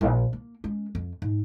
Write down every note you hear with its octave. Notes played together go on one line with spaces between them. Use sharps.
A#1
A#3
G#3 C#4
F2
G#2